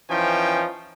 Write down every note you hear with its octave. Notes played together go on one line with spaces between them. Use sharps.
E3 F3 C#4 D#4 G5